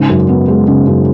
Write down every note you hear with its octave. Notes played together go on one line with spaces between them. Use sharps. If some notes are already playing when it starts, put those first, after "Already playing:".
Already playing: G#2 C#3
F#2
B3
G#3
C#3
F#2